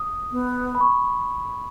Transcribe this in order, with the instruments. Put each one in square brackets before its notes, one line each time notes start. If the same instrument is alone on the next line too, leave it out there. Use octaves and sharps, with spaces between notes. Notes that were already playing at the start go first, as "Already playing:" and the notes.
Already playing: [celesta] D#6
[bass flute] B3
[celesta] B5
C#6